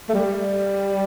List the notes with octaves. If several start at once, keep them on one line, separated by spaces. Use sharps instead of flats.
A3
G3